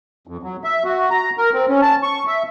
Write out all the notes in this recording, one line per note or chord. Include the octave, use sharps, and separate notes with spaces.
F2
F#3
E5
F#4
A#5
A#4
C4
C#4
A5
C#6
E5